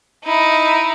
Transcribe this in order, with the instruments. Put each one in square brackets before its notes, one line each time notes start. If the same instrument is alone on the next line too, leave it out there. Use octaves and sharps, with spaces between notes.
[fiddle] D#4 E4